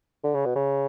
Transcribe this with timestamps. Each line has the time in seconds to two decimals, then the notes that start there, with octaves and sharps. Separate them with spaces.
0.24 D3
0.35 C#3
0.45 B2
0.56 C#3